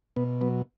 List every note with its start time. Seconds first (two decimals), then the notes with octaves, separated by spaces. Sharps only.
0.16 B2 B3
0.41 F#3 B3